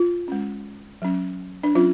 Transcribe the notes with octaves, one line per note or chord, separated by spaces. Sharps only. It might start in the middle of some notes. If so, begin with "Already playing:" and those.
Already playing: F4
G#3 C#4
F#3 C#4
D4
F#3 C#4 F4